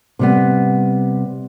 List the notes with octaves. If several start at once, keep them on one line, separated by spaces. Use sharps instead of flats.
C3 G3 B3